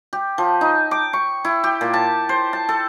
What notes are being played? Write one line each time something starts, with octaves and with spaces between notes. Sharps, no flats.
G4
F3
D#4
D6
C#6
E4
G4
A#2
A5
C5
A5
A4